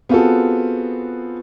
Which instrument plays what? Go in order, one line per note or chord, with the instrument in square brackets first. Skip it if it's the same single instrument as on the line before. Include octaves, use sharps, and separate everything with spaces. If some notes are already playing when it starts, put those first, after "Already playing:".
[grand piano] B3 C4 F4 F#4 G#4 A4